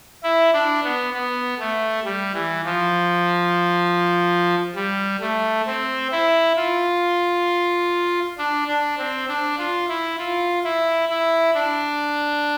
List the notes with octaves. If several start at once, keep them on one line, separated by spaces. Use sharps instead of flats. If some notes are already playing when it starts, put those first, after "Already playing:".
E4
D4
B3
B3
A3
G3
E3
F3
G3
A3
C4
E4
F4
D4
D4
C4
D4
F4
E4
F4
E4
E4
D4